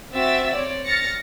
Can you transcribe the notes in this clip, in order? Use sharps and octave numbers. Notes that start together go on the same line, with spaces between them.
C4 F#4 E5 E6 A6
C4 C#5 D5
F6 A6 A#6 C#7